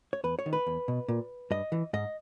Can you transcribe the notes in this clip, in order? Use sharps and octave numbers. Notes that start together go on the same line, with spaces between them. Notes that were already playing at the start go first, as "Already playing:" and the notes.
C#5
E2 B4
C#5
D#3
B4
E2
B2
A#2
G2 D#5
E3
G#2 D#5